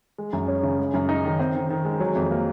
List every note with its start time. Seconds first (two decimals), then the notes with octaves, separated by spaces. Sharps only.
0.18 G#3
0.33 F#2
0.48 C#4
0.63 C#3
0.78 G#3
0.94 F#2
1.09 D#4
1.25 D#3
1.39 C4
1.55 D#3
1.70 D#3
1.85 G#3
2.00 F#3
2.15 F2
2.31 A#3